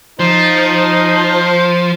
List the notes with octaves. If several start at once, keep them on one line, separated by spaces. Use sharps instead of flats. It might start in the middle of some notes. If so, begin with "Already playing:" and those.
F3 D#4 C5